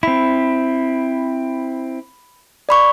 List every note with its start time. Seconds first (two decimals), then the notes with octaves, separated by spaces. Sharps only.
0.03 C4 E4 B5
2.69 D5 B5 C#6